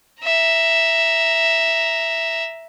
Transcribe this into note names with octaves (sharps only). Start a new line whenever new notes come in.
E5 A#5